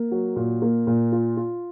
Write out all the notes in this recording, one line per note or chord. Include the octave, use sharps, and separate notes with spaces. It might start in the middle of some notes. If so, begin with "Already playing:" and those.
Already playing: A#3
F#3
A#2
A#3
A#2
F4
F4